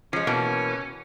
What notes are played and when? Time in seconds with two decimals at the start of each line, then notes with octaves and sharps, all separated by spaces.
0.13 F3 G#3 C#4
0.27 B2 E3 A#3